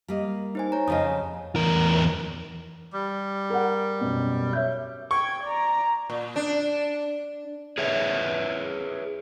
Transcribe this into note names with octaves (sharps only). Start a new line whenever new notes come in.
G3 A#3 D#5
D#4 C5 G#5
C#5 A#5
F2 C#3 C#5 D#5 D#6
E2 A#4
G3
A#4 F#5
F#2 B2
C#5 E5 G6
G5 C#6 G#6
D5 A#5
A#2
D4
G#4 B4 C#5 E5